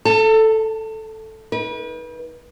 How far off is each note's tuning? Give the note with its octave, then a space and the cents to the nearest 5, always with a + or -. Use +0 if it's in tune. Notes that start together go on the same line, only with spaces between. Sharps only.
A4 +0 A5 +35
D#4 +40 B4 -30